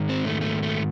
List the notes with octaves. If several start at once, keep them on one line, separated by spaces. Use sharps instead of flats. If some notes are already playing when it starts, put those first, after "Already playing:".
Already playing: G#2 D#3
C4
A3
A3
A3